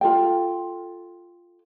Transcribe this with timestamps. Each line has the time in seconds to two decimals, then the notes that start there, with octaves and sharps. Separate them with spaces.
0.01 F4 A4 G5